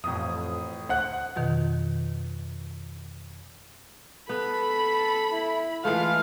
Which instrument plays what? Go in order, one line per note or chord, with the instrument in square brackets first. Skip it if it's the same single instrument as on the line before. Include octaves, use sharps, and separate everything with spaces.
[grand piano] A1 D#6 [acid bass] F2
[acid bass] D2 [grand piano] C5 F#5 F#6
[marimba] F2 B2 D#3
[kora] B3 [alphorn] A4 [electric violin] B5
[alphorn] E4
[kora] E3 G#3 A3 [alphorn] F4 [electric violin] F5